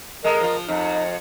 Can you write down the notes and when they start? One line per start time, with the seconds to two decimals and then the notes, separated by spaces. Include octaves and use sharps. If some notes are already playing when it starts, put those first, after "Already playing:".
0.24 G#3 A4 A#4 D#5
0.41 F3 F4
0.69 F2 D#4